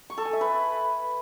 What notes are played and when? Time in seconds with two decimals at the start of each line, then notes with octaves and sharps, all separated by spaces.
0.10 C#6
0.18 A4
0.25 G#5
0.33 E5
0.41 B4